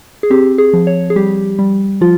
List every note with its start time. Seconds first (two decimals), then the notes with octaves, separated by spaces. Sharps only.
0.23 G#4
0.30 C4 G4
0.58 G#4
0.73 F3
0.87 C#5
1.10 G#4
1.16 G3 G4
1.59 G3
2.01 F3 F4